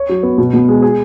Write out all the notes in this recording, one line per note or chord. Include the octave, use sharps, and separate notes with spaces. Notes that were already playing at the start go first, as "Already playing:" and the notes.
Already playing: C#5
F#3
B3
B2
B2
G#3
G#4